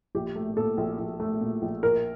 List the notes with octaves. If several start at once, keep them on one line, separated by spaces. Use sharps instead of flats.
A#1 G4
A3
A#2 A4
A#1
A#1
A3
A#2
A#1
A#1 A#4